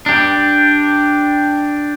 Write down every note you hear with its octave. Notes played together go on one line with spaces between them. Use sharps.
D4 G4